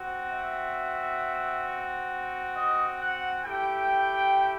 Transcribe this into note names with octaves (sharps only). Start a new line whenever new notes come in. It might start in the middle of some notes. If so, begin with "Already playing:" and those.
Already playing: C4 F#4
E5
D#5
F#5
A3 E4 G4 G5